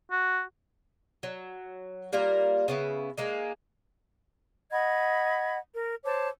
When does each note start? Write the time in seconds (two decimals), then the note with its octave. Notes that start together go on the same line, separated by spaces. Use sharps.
0.11 F#4
1.23 F#3
2.13 G3 A#3 F4 A#4
2.68 C#3 B3 E4
3.18 G#3 A#3 D#4
4.72 D#5 F#5 B5 G#6
5.73 A#4
6.04 C5 C#5 A5 D6